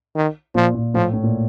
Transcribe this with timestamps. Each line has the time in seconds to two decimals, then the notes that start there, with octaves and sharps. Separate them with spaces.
0.15 D#3
0.55 A#2 F3
0.74 A#2
0.94 A2 F3
1.13 A2
1.23 A#2